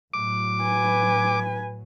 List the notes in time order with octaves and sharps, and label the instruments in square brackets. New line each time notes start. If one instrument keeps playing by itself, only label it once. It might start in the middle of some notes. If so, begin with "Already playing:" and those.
[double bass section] A2 F#3 [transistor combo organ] D6
[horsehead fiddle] B4 G#5